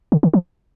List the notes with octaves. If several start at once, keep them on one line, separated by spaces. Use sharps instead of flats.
D3
D#3
F3